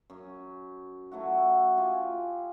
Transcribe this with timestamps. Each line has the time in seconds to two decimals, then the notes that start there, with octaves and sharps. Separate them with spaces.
0.10 F#2
1.11 F#3 A3 E4 F#4
1.78 F4 G4 F5 G#5